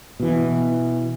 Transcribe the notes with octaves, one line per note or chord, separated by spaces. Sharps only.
B2 E3